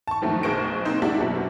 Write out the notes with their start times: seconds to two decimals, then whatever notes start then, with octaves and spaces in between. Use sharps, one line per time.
0.07 A5 C#6
0.22 G2 D#3 F3 F#3 A3
0.43 B1 G#4 C5 C#6 A#6 D7
0.85 A#3 C4 D#4 C5
1.02 G3 G#3 D4 E4 F#4
1.20 F#2 B2 F#3